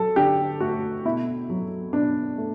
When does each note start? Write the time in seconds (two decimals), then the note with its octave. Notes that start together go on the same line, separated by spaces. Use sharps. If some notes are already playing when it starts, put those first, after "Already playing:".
Already playing: F#3 A4
0.16 D3 G4
0.60 A3 F#4
1.05 B2 E4
1.50 F#3
1.93 B2 D4
2.38 A3